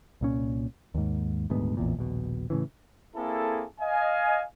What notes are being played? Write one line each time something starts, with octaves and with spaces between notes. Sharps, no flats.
C2 A#2 C#4
D#2 G#2
D#1 D2 G#2 B3
A1 E2 A#2
D#1 A#1 B2
A2 C#3 E3
A#3 C4 E4 G#4 A4
D#5 F5 G#5